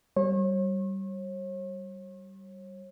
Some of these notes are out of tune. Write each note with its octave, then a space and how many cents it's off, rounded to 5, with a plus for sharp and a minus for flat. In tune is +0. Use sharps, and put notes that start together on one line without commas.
G3 -20 C#5 -40